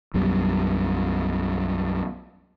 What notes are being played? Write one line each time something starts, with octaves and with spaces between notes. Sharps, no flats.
B1 F#2 B2 G3